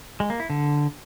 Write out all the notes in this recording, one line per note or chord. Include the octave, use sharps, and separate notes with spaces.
G#3
A#3
E4
D3